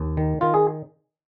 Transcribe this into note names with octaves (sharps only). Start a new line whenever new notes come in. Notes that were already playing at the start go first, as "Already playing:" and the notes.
Already playing: D#2
D#3
D#3 F4
G#4